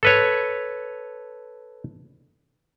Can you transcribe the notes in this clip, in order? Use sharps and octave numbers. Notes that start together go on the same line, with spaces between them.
A4 B4 C#5